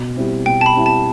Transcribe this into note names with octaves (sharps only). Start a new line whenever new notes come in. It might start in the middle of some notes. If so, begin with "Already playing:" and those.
Already playing: B2
G3 C4 E4
B2 G5
A5
B5
G3 C4 E4
A5